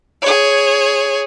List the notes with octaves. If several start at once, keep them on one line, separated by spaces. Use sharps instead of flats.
G#4 C#5